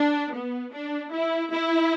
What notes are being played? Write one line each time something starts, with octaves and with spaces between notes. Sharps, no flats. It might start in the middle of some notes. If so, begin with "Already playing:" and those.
Already playing: D4
B3
D4
E4
E4